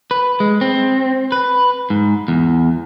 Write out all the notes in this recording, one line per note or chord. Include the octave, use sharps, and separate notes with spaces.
B4
G#3
C4
B4
G#2
E2